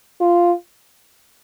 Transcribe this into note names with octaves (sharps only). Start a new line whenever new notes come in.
F4